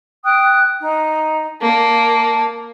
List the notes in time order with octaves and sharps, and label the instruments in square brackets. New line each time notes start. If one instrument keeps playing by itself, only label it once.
[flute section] G5 D#6 F#6
D#4
[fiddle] A#3 [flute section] D5 A5